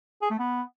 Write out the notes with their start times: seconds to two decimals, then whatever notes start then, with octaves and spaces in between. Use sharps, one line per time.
0.22 G#4
0.30 A3
0.39 B3